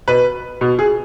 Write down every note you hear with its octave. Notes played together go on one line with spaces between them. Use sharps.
B2 B4
B2
G#4